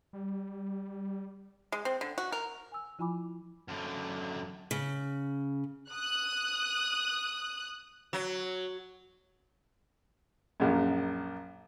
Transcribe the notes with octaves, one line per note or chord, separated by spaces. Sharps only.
G3
G#3
C4
D3
F#4
A#4
G#5 E6
F3 E4 F4 G#5 B5 D6
F#2 D3
C#3
D#6 F#6
F#3
A#1 F#2